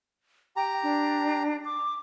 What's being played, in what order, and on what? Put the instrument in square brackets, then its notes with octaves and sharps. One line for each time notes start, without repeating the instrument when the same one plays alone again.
[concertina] G4 A#5 [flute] G5
[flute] D4
D6